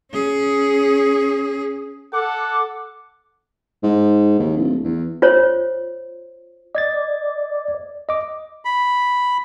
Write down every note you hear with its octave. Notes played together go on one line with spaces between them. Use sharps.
C#4 G#4
A4 F#5 D6
G#2
D#2
D1
E2
F4 C5 C#5
D5 D#5 G#6 A6
D#5 D6
B5